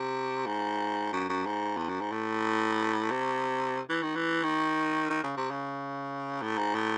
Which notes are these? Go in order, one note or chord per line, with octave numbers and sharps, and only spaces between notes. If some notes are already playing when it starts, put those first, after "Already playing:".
Already playing: C3
G#2
F#2
F#2
G#2
E2
F#2
G#2
A2
C3
E3
D#3
E3
D#3
D#3
C#3
C3
C#3
A2
G#2
A2